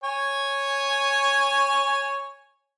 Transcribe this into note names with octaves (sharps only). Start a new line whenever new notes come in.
C#5 G#5